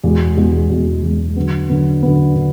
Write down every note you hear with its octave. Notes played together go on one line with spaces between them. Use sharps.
E2 B2 G#3
E2 B2 G#3
E2 B2 G#3
E2 B2 G#3
D3 F#3 B3
D3 F#3 B3
D3 F#3 B3
D3